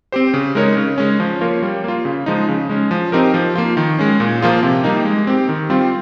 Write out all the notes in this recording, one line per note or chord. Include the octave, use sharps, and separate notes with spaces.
C4 G4 C5
C#3
G#3 D#4 A#4 C#5
C#3
G#3 C#4
F3
A#3 F4 A#4 C#5
G3
A#3 F4
C#3
F3 G#3 D#4
C#3
G#3 C#4
F3
C4 D#4 G4 A#4
F3
A#3 F4
D#3
G#3 C#4
A#2
F3 A#3 F4 G#4
C3
G3 A#3 D#4
G#3
C4 G4
D#3
G3 C4 F4